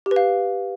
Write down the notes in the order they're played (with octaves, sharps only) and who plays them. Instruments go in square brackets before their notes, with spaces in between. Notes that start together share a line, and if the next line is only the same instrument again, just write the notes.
[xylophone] G4
B4
F5